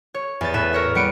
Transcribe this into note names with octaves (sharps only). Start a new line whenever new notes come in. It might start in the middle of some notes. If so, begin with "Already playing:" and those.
C#5
E2 A6
A2 B4 E5 E7
A#4 C#5 E5
G3 B3 C#7 D7